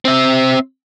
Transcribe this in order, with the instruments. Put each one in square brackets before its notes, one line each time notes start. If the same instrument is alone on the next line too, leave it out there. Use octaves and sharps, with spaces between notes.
[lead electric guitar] C4 E5